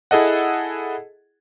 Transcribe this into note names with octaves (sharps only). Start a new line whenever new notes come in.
E4 G#4 A4 D#5 F#5